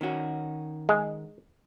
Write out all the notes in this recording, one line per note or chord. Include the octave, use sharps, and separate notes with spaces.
D#3 C#4 F#4
G#3